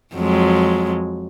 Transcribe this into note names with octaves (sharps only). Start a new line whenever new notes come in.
F2 F#3 G#3